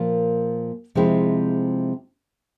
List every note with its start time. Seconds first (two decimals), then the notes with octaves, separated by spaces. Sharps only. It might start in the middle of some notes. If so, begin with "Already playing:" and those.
Already playing: A#2 F3 A#3
0.95 C3 F3 G#3 C4 E4